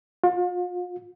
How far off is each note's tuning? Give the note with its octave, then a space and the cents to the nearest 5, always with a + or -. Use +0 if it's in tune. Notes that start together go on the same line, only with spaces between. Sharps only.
F4 +40